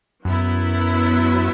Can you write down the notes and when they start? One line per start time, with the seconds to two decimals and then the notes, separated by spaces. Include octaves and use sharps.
0.25 F#2 F#3 B3 E4